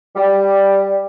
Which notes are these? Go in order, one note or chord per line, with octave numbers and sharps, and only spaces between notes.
G3